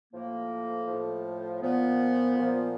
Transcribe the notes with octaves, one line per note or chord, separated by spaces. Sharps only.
A2 F3 A#3
A2 F3
A#2 F3 B3
A#2 F3